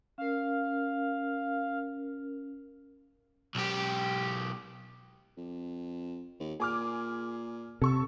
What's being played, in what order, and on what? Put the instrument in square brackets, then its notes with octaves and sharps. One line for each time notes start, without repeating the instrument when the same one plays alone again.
[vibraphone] C#4 A#4 [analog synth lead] F5
[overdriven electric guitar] B1 G4
[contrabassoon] F2
D#2
[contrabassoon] A#2 [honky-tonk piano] G#4 D6 F6
[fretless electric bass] C3 [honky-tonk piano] A4 C#6 E6